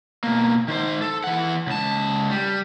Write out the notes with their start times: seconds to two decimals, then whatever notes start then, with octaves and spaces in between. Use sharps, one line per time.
0.24 B2 A#3
0.68 D#3 C5
1.02 A4
1.24 E3 F#5
1.67 C#2 A5
2.30 G3